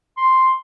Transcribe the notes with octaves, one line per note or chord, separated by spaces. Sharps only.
C6